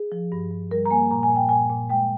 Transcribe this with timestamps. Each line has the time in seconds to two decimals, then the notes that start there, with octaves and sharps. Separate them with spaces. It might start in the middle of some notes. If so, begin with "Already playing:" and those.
Already playing: G#4
0.12 F3
0.32 G2
0.51 G2
0.71 G3 A#4
0.85 A#5
0.91 A#3 G#5
1.11 A#2 A#5
1.23 G#5
1.30 A#2
1.36 G5
1.49 A#2 G#5
1.70 A#2
1.90 G#3 G5